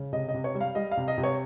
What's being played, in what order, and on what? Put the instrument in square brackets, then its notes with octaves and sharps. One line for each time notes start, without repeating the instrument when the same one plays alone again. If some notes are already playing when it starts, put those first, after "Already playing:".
Already playing: [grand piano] C#3
C3 D#5
D#5
C3
C#5
G3
F5
G3 D#5
F5
C3
D#5
C3
C#5